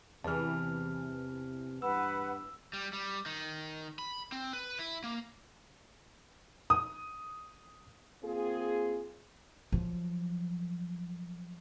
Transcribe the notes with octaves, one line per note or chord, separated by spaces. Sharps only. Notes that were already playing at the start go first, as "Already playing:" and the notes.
E2 C3 E3 A5 F6
G2 B4 F#5 E6
G3
G3
D#3
B5
C4
B4
E4
A#3
D#6
A#3 C4 F4 G#4
F3 F#3